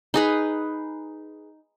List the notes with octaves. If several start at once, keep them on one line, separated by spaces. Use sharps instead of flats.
D#4 G#4 B4